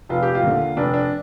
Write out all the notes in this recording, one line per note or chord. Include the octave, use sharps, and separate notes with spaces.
F1 F4
G4
F4
D#2 D3
F1 D4
D4